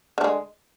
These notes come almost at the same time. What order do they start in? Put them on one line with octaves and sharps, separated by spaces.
D3 A3 G#3